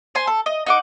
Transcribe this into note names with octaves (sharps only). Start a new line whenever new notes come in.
C5 G#5 C6
A4
D#5
D#4 F#5 D6